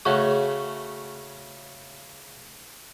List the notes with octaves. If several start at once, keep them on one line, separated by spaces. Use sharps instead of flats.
C#3 A3 C#4 F#4